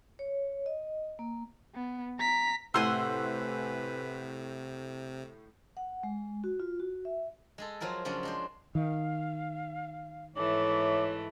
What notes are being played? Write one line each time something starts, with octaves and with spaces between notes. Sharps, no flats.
C#5
D#5
A#3
B3
A#5 B6
A2 C3 B4 C5 F#5 G#5 C6 E6
F#5
G#3
F#4
F4
F#4
E5
G#3 G#4 A4
F3 F#3 F4 G#4 A#4
C#3 F3 F#3 C#4 D4 F4
G#3 D4 C5
D#3 F5
G#2 E3 A3 C#5 D6